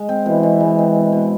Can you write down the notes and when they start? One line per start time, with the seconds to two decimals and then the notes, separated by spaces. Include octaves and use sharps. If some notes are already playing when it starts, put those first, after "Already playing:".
Already playing: G#3
0.09 C4
0.26 B2 E3
0.43 B2
0.60 G#3
0.79 C4
0.96 B2
1.12 B2